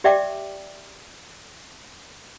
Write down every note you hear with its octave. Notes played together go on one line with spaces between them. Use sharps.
G4 D5 E5 G5 D6